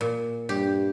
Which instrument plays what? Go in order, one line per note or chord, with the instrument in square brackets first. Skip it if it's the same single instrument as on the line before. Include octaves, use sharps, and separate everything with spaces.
[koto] A#2
[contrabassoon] G2 [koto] G4